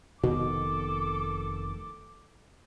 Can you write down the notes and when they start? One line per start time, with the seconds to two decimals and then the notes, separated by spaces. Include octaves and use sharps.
0.24 F1 B2 D#3 B3 A4 D6